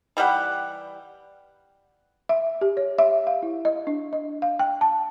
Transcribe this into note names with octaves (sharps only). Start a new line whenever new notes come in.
E3 G3 G4 F#5
E5
G4
C#5
E5
F5
E4
D#5
D4
D#5
F5
G5
A5